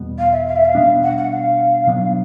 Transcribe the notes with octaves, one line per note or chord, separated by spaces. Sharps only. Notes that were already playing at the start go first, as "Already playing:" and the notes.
Already playing: E2 B2 G3 B3
F5
E5
F5
E5
F5
B2 G3 B3 D4
F#5
F#5
F5
B2 F#3 B3 D4